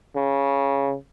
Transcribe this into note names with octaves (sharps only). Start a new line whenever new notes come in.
C#3